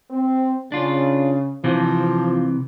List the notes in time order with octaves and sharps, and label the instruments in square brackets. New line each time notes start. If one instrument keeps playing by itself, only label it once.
[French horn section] C4
[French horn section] C#3 [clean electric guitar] D4 F4
[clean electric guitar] C3 E3 C4 [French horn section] F3